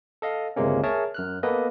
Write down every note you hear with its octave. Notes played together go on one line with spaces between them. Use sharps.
A4 D#5 F5
G1 C#2 C3 G#3 A#3 C#4
G#4 A#4 C#5 E5 A5 A#5
F#2 F6 F#6
A#3 B3 A4 B4 D#5